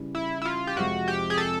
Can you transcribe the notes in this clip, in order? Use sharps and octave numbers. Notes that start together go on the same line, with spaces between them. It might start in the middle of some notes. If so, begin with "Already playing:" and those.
Already playing: C#3 E3 G3
E4
E4
F4
G4
F2 C3 F3 G#3 F#4
G4
G#4
A4